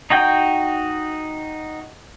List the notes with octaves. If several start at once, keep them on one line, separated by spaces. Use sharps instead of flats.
D#4 F#4 G5 G6